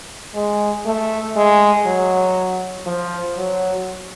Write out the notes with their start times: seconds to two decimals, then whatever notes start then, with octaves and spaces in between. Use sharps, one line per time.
0.35 G#3
0.85 A3
1.36 G#3
1.86 F#3
2.86 F3
3.37 F#3